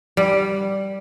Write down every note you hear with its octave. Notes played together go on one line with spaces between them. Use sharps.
G3